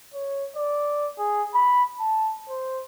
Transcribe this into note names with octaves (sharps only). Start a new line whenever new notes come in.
C#5
D5
G#4
B5
A5
C5